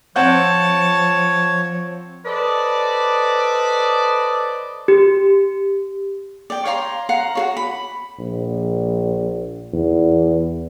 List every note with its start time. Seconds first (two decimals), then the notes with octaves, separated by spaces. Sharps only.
0.16 F3 C4 C#5 F#5 A5 G6
2.25 A4 B4 C5 D5 D#5
4.88 G4
6.50 D5 G5
6.65 C#5 F5 A#5 C6
7.09 F5 F#5 A#5
7.35 F#4 G#4 C#5
7.57 B5
8.19 A#1
9.73 E2